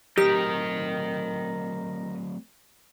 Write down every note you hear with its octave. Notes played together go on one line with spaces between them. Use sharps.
F#3 A3 C4 G4 A#4 D#5